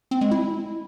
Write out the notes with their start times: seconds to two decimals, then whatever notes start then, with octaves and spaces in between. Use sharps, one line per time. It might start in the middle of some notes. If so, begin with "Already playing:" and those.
0.11 C4
0.21 G#3
0.31 E4